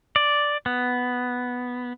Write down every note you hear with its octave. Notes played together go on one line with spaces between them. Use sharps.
D5
B3